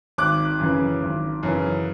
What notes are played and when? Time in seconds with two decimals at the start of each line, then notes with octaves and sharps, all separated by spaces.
0.18 G#1 D6 F#6
0.60 F#2 C#3 E3
1.02 G#1
1.43 F#2 C#3 E3